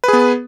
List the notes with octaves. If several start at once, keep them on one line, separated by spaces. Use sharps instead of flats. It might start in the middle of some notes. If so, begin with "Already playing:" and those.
B3 G#4 B4